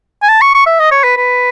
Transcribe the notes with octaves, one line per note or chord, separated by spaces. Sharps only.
G#5
A5
C#6
C#6
E5
D#5
C#5
B4
B4